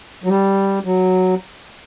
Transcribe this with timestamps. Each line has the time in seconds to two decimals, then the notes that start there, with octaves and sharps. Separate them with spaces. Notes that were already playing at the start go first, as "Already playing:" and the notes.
0.24 F#3
0.29 G3
0.84 F#3